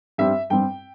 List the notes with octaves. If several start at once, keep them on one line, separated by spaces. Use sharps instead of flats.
G2 G3 C4 E5
G2 G3 C4 G5